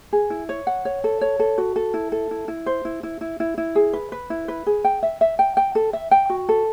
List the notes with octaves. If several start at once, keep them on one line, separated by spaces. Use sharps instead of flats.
G#4
E4
C#5
F#5
C#5
A4
C#5
A4
F#4
A4
E4
A4
E4
E4
C5
E4
E4
E4
E4
E4
G#4
B4
B4
E4
B4
G#4
G5
E5
E5
G5
G5
A4
E5
G5
F#4
A4